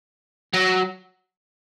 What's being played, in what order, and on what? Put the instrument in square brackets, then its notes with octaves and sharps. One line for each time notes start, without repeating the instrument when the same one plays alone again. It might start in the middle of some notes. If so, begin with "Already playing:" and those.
[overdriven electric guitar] F#3